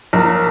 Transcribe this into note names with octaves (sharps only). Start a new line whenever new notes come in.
A#1 A#4